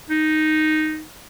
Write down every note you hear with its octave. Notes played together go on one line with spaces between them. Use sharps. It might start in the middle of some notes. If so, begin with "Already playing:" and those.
D#4